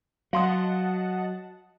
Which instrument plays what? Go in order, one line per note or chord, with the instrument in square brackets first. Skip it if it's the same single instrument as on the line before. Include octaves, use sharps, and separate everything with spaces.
[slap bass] F#3 [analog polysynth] D#5 F#5 A5 [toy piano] F5 C6 D#6